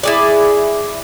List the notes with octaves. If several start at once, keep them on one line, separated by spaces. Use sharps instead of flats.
E4 G#4 D5